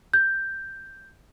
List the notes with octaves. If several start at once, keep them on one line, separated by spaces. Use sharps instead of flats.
G6